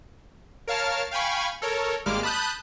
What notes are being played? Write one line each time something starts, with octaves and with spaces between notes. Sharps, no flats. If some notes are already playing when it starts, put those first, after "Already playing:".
A#4 C#5 F5 A5 F6
F5 G5 G#5 B5 C#6
A4 A#4 C#5
G#1 G3 G#3 A#3 D6 F6
A5 B5 D#6 F#6 G6